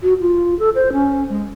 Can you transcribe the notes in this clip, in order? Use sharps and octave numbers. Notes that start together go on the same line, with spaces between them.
F#4
F4
A4
C5
C#4
G#3